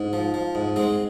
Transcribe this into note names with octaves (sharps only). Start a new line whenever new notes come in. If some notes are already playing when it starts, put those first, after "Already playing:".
Already playing: G#2
F3
F3
G#2
G#2 G#3 C4